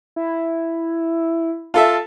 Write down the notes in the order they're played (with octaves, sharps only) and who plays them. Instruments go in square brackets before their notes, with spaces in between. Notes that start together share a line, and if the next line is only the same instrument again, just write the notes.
[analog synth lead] E4
[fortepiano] F4 A4 E5 [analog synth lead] A5